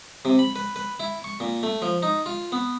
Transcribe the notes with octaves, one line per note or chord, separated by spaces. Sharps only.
C3
B5
B4
B4
E4
C#6
A#2
A3
F3
D#4
F4
B3